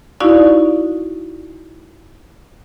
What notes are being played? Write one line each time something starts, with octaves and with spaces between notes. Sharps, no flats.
D#4 E4 F#4 D5 F5 C#6